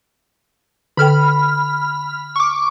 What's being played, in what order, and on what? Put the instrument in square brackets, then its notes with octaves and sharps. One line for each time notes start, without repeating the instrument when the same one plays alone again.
[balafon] D3 A4 G5 [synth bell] B5 F6
[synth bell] C#6 D6